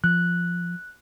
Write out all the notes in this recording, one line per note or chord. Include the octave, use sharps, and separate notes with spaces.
F3 F#6